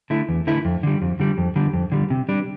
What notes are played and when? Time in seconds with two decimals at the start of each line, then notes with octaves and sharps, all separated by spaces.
0.10 D3 A3 E4
0.29 E2
0.47 D3 A3 E4
0.65 F2
0.83 D3 G3
1.02 F2
1.20 D3 G3
1.38 F2
1.56 D3 G3
1.74 F2
1.92 D3 G3
2.10 C3
2.29 G3 D4